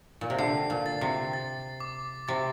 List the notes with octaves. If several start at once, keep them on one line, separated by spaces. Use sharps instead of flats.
A#2
C3
D3 C7
A#2
A6
C3
A6
D6
C3 A6